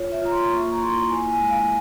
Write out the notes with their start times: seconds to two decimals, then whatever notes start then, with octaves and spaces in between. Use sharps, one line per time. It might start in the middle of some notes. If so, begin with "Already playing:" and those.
Already playing: F4 C#5
0.12 E5
0.22 F4 A#5
0.31 C6
0.51 A#3 C#6
0.72 A#5
0.81 E4 C6
1.10 E4 G#5
1.30 G#5
1.39 G#3
1.50 F5